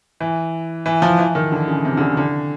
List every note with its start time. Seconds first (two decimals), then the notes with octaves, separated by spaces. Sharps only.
0.20 E3
0.86 E3
1.02 F3
1.19 E3
1.35 D#3
1.52 D3
1.68 C#3
1.85 C3
1.97 D3
2.00 C#3
2.17 D3